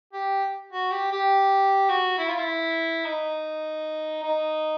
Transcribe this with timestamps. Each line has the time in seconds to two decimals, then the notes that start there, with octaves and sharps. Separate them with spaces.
0.13 G4
0.73 F#4
0.92 G4
1.12 G4
1.89 F#4
2.18 E4
2.28 F4
2.38 E4
3.06 D#4
4.23 D#4